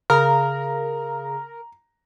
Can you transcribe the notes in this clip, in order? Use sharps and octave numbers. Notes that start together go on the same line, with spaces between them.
C#3 A#4 A#5